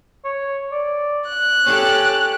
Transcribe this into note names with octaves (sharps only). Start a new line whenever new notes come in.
C#5
D5
F#6
C#4 G4 A4